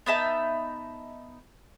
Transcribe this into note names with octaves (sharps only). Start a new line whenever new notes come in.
B3 D#4 E5 A5